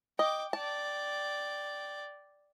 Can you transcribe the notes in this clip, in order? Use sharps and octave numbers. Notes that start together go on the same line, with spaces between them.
D#5 G5 D6
D5 G5 A5